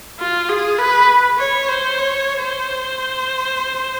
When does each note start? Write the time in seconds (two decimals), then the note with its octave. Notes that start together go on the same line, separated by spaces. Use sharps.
0.20 F4
0.49 G#4
0.79 B4
1.39 C#5
1.69 C5
1.98 C#5
2.42 C5